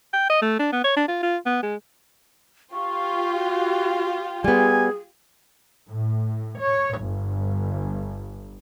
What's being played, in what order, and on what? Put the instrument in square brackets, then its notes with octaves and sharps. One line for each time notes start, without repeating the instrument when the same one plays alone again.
[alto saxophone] G5
D#5
A3
D4
B3
C#5
D4
F4
F4
B3
G#3
[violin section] F4 G4 [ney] C#6
[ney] F#4
[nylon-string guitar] G3 B3 [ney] G#4 [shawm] G#5
[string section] A2
C#5
G1